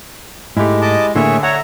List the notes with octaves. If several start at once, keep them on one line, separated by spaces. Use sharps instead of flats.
G#2 G#3 A3 E4 G4
D#5 A5 D6
A2 D3 A#3 G#4 C#5 E5
C#5 E5 F#5 A#5